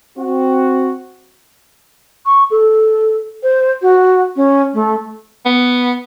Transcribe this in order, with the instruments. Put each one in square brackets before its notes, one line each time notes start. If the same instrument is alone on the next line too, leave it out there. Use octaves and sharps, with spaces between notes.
[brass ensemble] C4 F#4
[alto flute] C#6
A4
C5
F#4
C#4
A3
[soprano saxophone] B3